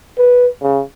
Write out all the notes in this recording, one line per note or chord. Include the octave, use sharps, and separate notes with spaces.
B4
C#3